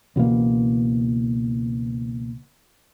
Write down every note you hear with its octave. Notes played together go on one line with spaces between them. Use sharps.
C#2 B2 E3 A#3